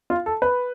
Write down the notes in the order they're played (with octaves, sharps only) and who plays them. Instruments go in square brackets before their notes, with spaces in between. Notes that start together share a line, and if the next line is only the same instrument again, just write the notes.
[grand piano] F4
A4
B4